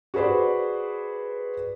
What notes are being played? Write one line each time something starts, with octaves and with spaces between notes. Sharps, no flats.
F#4 G#4 B4 C5 D5